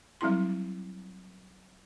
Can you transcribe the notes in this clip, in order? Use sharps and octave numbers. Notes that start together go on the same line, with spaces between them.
F#3 G3 C4 E4 C6